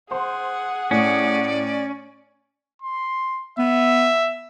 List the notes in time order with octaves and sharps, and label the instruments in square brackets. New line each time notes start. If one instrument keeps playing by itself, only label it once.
[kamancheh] G#4 F#5 [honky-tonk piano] C5 C6
[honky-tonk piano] A2 [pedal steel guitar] C#4 [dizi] D5
[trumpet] C6
[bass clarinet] B3 [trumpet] E5